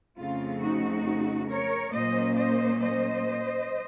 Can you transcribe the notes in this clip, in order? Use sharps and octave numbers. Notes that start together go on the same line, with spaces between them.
F2 C#3 A3 C4 F4
D#4 F#4
A#4 C#5
A#2 F#3 A#3 C#4 C5 D#5
C5 D#5
C5 D#5